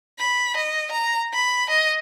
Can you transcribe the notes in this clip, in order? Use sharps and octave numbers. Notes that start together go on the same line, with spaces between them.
B5
D#5
A#5
B5
D#5